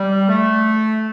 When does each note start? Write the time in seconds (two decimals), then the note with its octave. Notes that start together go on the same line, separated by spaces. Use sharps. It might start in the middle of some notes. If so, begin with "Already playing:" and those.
Already playing: G3
0.28 A3